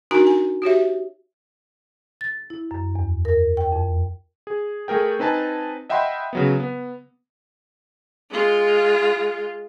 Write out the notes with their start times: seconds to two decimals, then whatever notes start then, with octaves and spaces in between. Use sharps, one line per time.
0.11 D4 D#4 F#4 A#4 G#5 A#5
0.27 G#5
0.62 F#4 G4 C#5 E5
2.21 A6
2.50 E4
2.71 F#2
2.95 E2
3.25 A#4
3.57 G5
3.72 F2
4.47 G#4
4.88 A3 G#4 A#4 G5
5.19 C4 D#4 B4 G#5 A5
5.89 D#5 E5 F#5 G5 B5 C6
6.33 C#3 F#3 B3
6.60 B3
8.30 G#3 F4